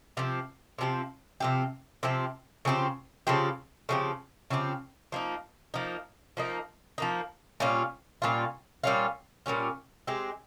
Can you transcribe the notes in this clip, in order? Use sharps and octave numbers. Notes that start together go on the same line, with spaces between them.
C3 F3 C4 G4
C3 F3 C4 G4
C3 F3 C4 G4
C3 F3 C4 G4
C#3 F3 C4 G4
C#3 F3 C4 G4
C#3 F3 C4 G4
C#3 F3 C4 G4
F3 A#3 D#4
F3 A#3 D#4
F3 A#3 D#4
F3 A#3 D#4
A#2 G3 C#4 F4
A#2 G3 C#4 F4
A#2 G3 C#4 F4
A#2 G3 C#4 F4
G#3 C4 G4